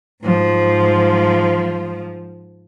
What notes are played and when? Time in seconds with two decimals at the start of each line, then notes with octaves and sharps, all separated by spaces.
0.24 G#2 F3